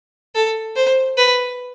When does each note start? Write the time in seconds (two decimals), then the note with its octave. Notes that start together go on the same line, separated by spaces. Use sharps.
0.35 A4
0.76 C5
1.17 B4